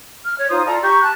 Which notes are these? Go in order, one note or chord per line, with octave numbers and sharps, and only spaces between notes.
F6
C#5
D#4 F4 C5 D#6
F4 A4 D5 A#5
G4 A#5 C#6 G6
A5 F#6